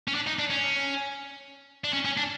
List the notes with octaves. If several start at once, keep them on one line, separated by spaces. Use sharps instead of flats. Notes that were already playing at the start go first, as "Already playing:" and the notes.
C#4
D4
D#4
D4
C#4
D4
C#4
C#4
D4